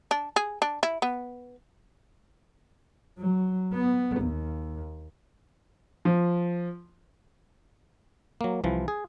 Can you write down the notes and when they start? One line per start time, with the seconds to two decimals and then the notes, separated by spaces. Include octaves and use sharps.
0.11 D4
0.36 G#4
0.62 D4
0.83 E4
1.02 B3
3.18 F#3
3.73 B3
4.21 D#2
6.05 F3
8.41 F#3 A#3
8.64 C2 E3 F3
8.88 G#4